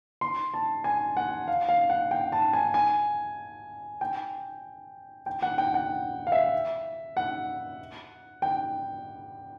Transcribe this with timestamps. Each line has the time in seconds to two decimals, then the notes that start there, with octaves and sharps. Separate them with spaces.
0.21 C6
0.54 A5
0.84 G#5
1.17 F#5
1.48 F5
1.69 F5
1.90 F#5
2.11 G5
2.32 A5
2.53 G#5
2.74 G#5
4.01 G5
5.26 G5
5.42 F#5
5.58 G5
5.74 F#5
6.27 F5
6.32 E5
7.17 F#5
8.42 G5